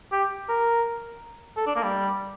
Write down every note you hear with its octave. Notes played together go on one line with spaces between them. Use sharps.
G4
A#4
A4
D4
A#3
G3